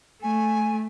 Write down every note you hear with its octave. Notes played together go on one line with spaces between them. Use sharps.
A3 G#5